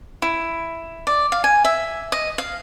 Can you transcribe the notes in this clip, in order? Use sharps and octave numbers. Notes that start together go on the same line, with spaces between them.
E4
D5
F5
G#5
E5
D#5
F5